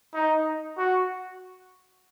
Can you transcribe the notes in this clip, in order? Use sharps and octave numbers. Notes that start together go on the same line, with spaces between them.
D#4
F#4